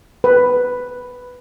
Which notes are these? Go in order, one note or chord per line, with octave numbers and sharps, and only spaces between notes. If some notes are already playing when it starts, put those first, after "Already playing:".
B4